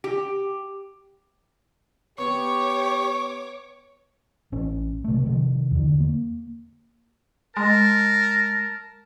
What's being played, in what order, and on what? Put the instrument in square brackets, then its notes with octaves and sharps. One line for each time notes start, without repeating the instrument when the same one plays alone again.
[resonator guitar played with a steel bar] G4
[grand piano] B3 [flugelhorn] G4 [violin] C#5 D6 [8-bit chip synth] C#6
[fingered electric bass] A1 C#4
C3 A3
C3 D#3 F3
E2 D3
A#3
[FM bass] G#3 [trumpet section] A#4 A5